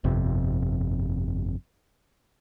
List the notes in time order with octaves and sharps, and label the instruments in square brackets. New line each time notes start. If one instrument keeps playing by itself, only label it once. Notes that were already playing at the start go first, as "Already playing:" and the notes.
[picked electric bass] G1 F2 C3